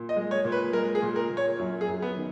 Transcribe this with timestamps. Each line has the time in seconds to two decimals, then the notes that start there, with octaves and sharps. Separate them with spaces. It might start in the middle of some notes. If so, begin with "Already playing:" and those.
Already playing: A#2
0.09 D#5
0.16 G#3
0.31 C#5
0.45 A#2
0.52 B4
0.73 G#3 A#4
0.95 G#4
1.02 A#2
1.16 A#4
1.30 A#2
1.37 C#5
1.59 F#2
1.81 G#4
1.88 F#2
2.02 B3
2.16 D#3